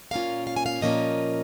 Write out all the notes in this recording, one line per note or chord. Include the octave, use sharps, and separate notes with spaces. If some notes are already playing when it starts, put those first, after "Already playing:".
A#2 A#3 C#4 F4 F5
F5
G#5
F5
A#2 F3 A#3 C#4 F4 D#5